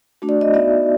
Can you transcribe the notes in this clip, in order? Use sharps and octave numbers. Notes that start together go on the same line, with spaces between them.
A3 D4 F#4
D5
D#5
B3 D#4 F#4 D5 E5